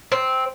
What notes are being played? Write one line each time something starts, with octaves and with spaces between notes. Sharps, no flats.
C4